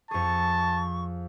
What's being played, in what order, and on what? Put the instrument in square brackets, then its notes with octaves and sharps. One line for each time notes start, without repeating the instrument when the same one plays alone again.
[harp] F2 G#4 [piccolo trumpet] A5 [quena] C#6